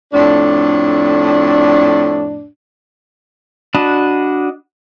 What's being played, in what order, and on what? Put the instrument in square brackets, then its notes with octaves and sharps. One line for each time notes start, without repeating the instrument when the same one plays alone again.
[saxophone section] F2 A2 D4
[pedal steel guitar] D4 F#4 D#5 A5 B5